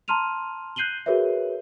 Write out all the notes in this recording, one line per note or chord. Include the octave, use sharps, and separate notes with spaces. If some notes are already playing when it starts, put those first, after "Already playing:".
A5 A#5 C6 F6 D#7 F7
F#6 G6 C7 D#7 F#7 G7
F#4 G#4 A#4 B4 C#5 E5